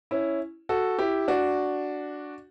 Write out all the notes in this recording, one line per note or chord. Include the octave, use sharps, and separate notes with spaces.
C#4 E4
F#4 A4
E4 G4
D4 F#4